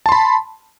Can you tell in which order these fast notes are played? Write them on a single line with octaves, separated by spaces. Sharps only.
A5 C6 B5